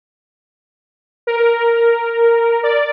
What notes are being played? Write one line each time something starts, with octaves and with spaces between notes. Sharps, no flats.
A#4
D5